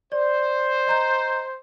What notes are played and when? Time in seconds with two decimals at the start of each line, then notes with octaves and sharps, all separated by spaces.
0.12 C5 D5
0.87 D#5 A#5 G6